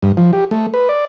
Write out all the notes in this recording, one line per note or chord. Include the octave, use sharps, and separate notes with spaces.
G2
F3
G4
A3
B4
D5